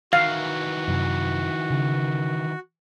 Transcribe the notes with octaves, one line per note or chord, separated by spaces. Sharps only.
D#3 E3 F#4 F5
F#2 C3
C#3